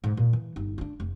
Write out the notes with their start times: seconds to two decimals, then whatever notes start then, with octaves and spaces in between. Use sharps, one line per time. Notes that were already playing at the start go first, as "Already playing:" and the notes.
0.04 G#2
0.17 A#2
0.33 E3
0.56 G1 D#4
0.78 D4 E4
1.00 F1